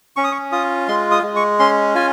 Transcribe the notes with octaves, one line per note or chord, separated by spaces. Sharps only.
C#4 C#6
D#6
C#6
F4 D#6
G#3 C6
D#6
G#3
C#6
C#4 C6
F4 G#5